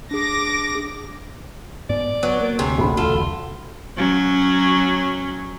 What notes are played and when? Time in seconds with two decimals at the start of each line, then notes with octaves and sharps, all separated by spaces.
0.11 D4 G#4 D6 A#6
1.89 G#2 B3 D5
2.23 F#3 B3
2.41 A#3
2.59 D2 C3 G#4
2.78 G#1 D2 A#2 D3 B5
2.97 E1 C2 F4 A4
3.97 F#3 C#4